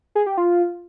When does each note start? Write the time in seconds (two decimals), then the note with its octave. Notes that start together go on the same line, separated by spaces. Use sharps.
0.15 G#4
0.26 G4
0.37 F4